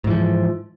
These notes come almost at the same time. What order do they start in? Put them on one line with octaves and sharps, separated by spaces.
G#2 E3 F3